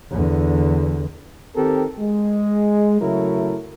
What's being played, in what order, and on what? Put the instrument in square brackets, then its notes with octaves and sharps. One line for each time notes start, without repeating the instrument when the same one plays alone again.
[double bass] E2 D3
[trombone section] D#3 C4 G4 A4 A#4
G#3
C#3 F#3 A3 E4 A#4